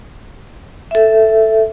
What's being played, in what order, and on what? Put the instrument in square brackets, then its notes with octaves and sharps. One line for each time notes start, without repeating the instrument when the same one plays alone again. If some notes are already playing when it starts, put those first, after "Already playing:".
[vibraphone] A4 E5